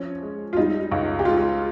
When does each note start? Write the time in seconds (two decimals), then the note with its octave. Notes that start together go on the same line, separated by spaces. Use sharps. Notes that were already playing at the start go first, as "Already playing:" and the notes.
Already playing: F3 C#4
0.23 G#3
0.53 F4
0.57 G3 D#4
0.92 C#2
1.19 G4
1.25 G#3 F4